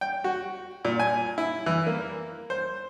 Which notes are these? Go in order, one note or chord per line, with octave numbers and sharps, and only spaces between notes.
G5
F#4
A#2
G#5
E4
E3
A#3
C5